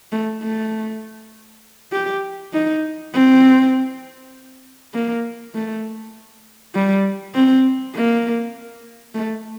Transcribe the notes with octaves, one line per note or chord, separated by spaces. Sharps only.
A3
A3
G4
D#4
C4
A#3
A3
G3
C4
A#3
A3